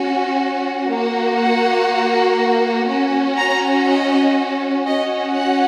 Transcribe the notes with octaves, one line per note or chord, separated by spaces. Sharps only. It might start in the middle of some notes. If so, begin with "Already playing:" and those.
Already playing: C#4 F#4
A#3 F#4
F#5
C#4 F#4
A#5
D#5
C#4 F#4 D#5
F#5